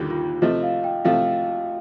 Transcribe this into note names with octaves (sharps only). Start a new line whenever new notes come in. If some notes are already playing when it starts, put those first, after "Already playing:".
Already playing: D#2 D3 G3 A#3 D#4 F4
F4
C3 F3 A3 D#5
F5
G5
C3 F3 A3 F5